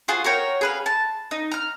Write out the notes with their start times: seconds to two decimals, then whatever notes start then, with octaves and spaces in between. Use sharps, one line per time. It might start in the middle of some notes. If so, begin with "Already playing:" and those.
0.08 F4 F#4 G#4 C5
0.24 F#4 A#4 C#5 G5
0.61 G#4 B4 F5
0.86 A5
1.31 D#4
1.52 A#5 F6